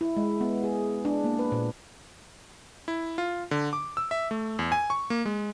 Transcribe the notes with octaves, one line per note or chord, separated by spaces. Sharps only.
E4
G#3
B3
G#4
D4
A#3
B4
A#2
E4
F4
D3
D6
E6
E5
A3
E2
G#5
C#6
A#3
G#3